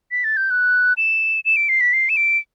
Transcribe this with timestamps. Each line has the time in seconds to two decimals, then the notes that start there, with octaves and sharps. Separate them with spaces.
0.12 B6
0.24 A6
0.37 G6
0.51 F#6
0.97 E7
1.45 E7
1.56 D7
1.69 C7
1.81 B6
1.93 C7
2.09 E7
2.17 D7